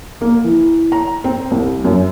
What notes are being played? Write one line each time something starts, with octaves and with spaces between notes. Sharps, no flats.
A#3
E3
A#5
C4
C2
F#2